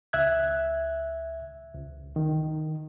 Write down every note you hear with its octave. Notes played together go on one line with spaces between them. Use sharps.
C#2 E5 F#6 G#6
C#2
D#3